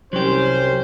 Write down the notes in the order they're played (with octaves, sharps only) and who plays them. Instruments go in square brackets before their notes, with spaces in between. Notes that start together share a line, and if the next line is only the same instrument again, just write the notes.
[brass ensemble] C2 C#4 C5 [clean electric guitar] F#3 G4